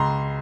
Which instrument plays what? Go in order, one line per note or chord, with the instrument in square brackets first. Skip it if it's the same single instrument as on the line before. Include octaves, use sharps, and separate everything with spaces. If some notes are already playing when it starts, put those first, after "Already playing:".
Already playing: [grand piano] C#2 A#5 C6